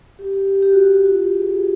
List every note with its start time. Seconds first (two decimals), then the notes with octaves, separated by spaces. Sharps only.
0.19 G4
0.34 G4
0.48 G4
0.62 G4
0.73 F#4
0.84 F#4
0.94 F#4
1.06 F4
1.20 G4
1.35 G#4
1.49 G#4